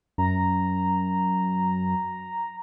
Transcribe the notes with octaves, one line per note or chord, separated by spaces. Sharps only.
F#2 A#5